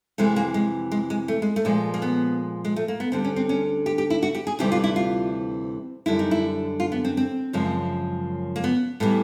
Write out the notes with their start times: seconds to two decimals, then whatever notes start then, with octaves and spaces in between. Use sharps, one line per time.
0.18 F2 C3 E3 G#3 A3
0.36 A#3
0.54 G#3
0.92 G#3
1.10 G#3
1.28 A3
1.42 G#3
1.56 A3
1.65 A#2 F3 G#3
1.94 A#3
2.02 B3
2.65 G#3
2.76 A3
2.88 A#3
3.00 B3
3.12 D2 D3 G3 C4
3.25 C#4
3.36 C4
3.49 C#4
3.86 G4
3.98 G4
4.10 E4
4.23 F#4
4.35 G4
4.47 G#4
4.59 D2 C3 E3 G3 G4
4.72 F4
4.84 E4
4.96 F4
6.06 F#2 D3 G3 E4
6.19 D#4
6.31 E4
6.80 F4
6.92 B3
7.05 C4
7.17 C4
7.53 F#2 C#3 F3 G#3
8.56 A#3
8.64 B3
9.00 A2 E3 G3 B3